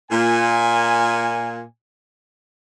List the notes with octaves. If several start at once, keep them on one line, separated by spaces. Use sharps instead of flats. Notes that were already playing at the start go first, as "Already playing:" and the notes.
A#2 G#5